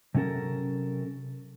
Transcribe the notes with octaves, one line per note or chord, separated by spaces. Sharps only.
C3 F#3 C#4 A4 A#4